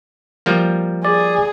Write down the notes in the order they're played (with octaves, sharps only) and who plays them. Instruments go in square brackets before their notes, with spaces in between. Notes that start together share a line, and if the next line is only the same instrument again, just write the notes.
[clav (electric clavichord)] F3 G3 A#3
[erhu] G#4 [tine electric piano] D5